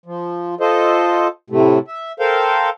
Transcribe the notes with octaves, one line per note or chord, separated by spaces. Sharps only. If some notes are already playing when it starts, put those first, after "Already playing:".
F3
F4 A4 C5 D#5
A2 C3 A3
E5
A4 A#4 C5 F5 G5